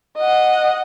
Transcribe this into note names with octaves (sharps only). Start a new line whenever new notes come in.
D#5 F#5